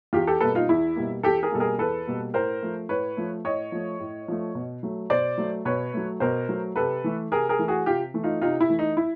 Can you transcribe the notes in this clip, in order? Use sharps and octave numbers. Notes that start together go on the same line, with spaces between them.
E2 F4 G4
G4 A4
B2 G3 A#3 A4 B4
D#4 F4
E2 E4
B2 G3 A#3
E2 G4 A4
G#4 A#4
B2 G3 A#3 A4
G#4 A#4
E2 A4 B4
B2 G3 A#3
A2 A#4 C5
F3 A3
A2 B4 C#5
F3 A3
A2 C#5 D#5
F3 A3
A2
F3 A3
B2
F#3 A3
B2 C5 D5
F#3 A3
B2 B4 C#5
F#3 A3
B2 A#4 C5
F#3 A3
C3 A4 B4
E3 A3
C3 G#4 A#4
G#4 A#4
E3 A3
F#4 G#4
C3 F4 G4
E3 A3
D#4 F4
C3 D#4 F4
E4
E3 A3
D#4
E4